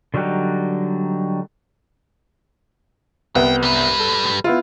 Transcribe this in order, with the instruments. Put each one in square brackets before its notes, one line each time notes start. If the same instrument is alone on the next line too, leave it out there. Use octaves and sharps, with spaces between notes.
[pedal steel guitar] D3 F#3 G3 D#4 F#5
[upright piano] C2 B3 [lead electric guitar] G5
[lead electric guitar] G3 B4
[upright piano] A4
B3 E4 F4